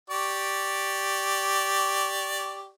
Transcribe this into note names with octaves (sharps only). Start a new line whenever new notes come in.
G4 D5 C#6